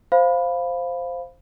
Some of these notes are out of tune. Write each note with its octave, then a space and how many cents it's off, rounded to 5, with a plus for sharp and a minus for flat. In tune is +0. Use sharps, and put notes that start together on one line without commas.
C5 +0 F5 +0 B5 +0